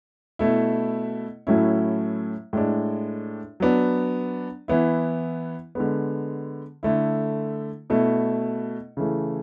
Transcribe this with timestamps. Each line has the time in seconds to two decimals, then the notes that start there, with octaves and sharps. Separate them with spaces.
0.39 B2 A3 E4
1.47 A2 F#3 A3 C#4 E4
2.53 A2 G#3 D4
3.60 F#3 B3 D4
4.68 E3 B3 E4
5.75 D3 G#3 B3
6.83 D3 A3 E4
7.90 B2 A3 E4
8.97 C#3 E3 A3